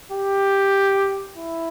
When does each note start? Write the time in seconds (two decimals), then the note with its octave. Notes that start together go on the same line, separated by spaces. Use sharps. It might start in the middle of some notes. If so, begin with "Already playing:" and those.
0.12 G4
1.36 E4